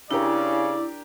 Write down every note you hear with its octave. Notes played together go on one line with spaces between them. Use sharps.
C#3 D4 E4 G4 A#4 D5